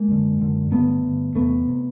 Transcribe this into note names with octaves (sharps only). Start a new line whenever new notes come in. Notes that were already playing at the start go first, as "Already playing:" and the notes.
Already playing: G#3 A#3
F#2 D3
F#2 D3
G2 D3 A3 B3
G2 D3
E2 C3 A3 B3
C3